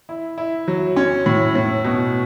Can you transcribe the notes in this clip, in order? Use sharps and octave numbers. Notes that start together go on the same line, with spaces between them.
E4
E4
F#3
C#4
A2
A2
B2